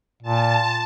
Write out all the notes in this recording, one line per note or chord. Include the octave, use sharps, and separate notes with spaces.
A#2 A5